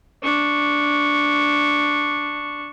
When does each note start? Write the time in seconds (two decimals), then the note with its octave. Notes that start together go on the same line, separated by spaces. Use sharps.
0.22 D4 C#6